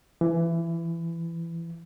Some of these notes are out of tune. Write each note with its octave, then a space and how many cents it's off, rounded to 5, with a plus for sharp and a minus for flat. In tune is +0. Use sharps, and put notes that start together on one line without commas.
E3 +20